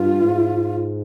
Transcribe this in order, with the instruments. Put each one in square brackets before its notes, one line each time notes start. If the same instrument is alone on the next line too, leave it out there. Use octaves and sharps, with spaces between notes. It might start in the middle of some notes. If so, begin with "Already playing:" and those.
Already playing: [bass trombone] G2 [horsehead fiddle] F4
[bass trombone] G#2